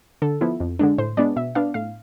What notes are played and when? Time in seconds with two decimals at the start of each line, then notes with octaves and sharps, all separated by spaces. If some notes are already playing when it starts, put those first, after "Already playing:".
0.22 D3 A4
0.41 F3 B3 E4
0.60 F2
0.79 D3 G#3 D4
0.98 A2 C5
1.17 G#3 B3 D4 D5
1.36 B2 E5
1.55 B3 D4 F5
1.74 A2 F5